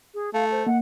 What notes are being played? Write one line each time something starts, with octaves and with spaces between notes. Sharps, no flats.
G#4
A3 F5
C5
A#3 F#5